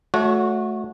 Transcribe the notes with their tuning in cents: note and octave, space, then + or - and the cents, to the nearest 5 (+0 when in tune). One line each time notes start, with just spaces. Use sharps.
A3 -15 F#4 -20 C#5 +25